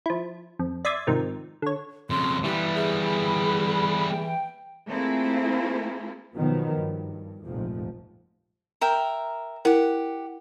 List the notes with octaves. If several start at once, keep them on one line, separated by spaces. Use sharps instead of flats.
F3 E4
F2
D5 E5 C6 D#6 G#6 A6
G#2 C3 D#3 F3
D3 C#5
F2 C#3 C6
E3 G3 B3 G4
G#4 E5
B5
G5
A3 A#3 C4 E4 F4 G#4
B2 D#3 F3 F#3 B3
G2
F1 A#1 F2 G#2 F3
A#4 E5 G5
E4 G4 A#4 F#5